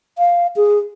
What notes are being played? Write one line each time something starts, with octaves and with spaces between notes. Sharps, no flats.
F5
G#4